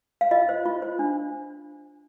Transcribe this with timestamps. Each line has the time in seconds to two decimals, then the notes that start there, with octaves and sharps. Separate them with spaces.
0.21 F5
0.31 F4 D#5
0.49 C5
0.65 F4
0.82 C5
0.99 D4